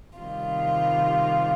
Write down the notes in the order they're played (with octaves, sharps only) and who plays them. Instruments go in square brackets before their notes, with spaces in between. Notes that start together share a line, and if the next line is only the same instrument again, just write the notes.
[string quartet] C3 D#3 G3 F4